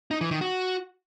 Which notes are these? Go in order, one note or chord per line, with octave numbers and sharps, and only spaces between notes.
D#4
E3
D#3
F#4